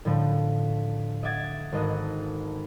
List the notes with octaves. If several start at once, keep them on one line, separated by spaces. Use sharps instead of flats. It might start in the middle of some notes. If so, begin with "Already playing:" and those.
A2 D3 F3 A3
B6
D#5 E5 F#5 D6 G#6 A6
G#1 A4 D#5 F#6